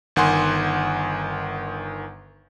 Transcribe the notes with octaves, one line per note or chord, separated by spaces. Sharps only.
G1 D#3 F#5 G#5 C6